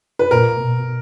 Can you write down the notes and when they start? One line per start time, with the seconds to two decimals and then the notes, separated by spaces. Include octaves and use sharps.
0.19 B4
0.31 A#2 A#4
0.60 B2